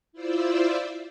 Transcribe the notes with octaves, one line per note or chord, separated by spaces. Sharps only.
E4 F4 C5 D5 E5